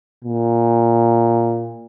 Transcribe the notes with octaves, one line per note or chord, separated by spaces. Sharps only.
A#2